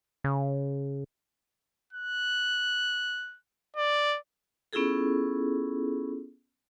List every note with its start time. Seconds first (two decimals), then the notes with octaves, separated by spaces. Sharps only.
0.24 C#3
1.93 F#6
3.77 D5
4.73 B3 C#4 E4 F4 G#4 A4